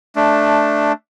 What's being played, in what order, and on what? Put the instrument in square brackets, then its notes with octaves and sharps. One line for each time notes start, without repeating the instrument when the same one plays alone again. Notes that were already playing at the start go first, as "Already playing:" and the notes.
[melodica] A3 D4